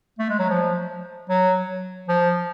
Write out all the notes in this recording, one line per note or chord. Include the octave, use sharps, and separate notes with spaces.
A3
G#3
F#3
F3
F#3
F3